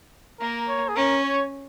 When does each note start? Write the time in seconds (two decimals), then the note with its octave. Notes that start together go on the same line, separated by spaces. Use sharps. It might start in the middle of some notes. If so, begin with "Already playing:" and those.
0.40 A#3 A#4
0.68 C#5
0.89 G#4
0.96 C#4 A#4
1.24 C#5